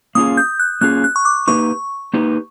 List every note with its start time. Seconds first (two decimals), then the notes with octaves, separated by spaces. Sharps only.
0.15 A#3 C#4 F4 G#4 D#6
0.37 G6
0.59 F#6
0.81 A#3 C#4 F4 G#4 F#6
1.04 F#6
1.16 C#6
1.25 D6
1.48 A#3 D#4 G4 B4 C#6
2.14 A#3 D#4 G4 B4